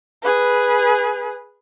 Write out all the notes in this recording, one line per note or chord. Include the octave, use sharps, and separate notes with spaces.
G#4 B4